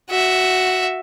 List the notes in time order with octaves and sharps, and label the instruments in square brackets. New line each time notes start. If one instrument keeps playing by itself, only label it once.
[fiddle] F#4 E5